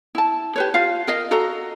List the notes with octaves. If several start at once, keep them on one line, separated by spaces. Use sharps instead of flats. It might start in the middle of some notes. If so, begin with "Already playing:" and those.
E4 A5
G4 B4 C#5
F4 F5
A#4 D#5 F5
F#4 A4 D#5 A#5